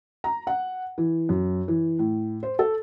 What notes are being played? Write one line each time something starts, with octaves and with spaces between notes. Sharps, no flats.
A#5
F#5
E3
F#2
E3
A2
C5
A4